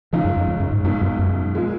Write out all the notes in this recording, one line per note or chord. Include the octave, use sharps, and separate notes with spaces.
C#2 C#3 F3 G#3 D#4
F#2
F2
F2
F#2
G#2
C#2 F#2 B2 G#3 D#4
F#2
F#2
A#2 F3 G#3